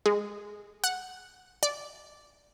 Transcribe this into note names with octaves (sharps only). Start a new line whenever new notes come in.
G#3
F#5
D5